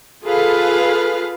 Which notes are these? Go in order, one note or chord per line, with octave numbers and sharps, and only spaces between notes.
F4 G#4 A4 B4 F5